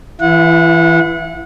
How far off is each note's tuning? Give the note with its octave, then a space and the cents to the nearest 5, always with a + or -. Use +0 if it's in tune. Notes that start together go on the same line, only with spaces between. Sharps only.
E3 +0 E4 +35 F#5 -30